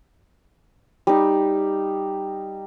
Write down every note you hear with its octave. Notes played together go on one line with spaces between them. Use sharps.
G3 D#4